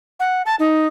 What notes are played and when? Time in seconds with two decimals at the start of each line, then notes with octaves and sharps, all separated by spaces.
0.20 F#5
0.46 A5
0.59 D#4